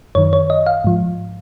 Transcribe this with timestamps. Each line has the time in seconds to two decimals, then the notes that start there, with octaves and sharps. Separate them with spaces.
0.15 F#2 D#3 C#5
0.33 C#5
0.50 D#5
0.66 F5
0.85 G#2 F3